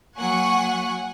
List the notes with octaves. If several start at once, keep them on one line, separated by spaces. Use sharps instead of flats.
F#3 A#3 F#5 G#5 C#6